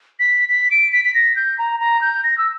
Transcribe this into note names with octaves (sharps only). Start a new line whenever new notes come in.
B6
B6
D7
B6
B6
A#6
G6
A#5
A#5
G6
A#6
E6